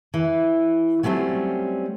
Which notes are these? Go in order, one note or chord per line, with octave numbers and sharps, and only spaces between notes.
E3
F#3 G3 A3 C4 C#4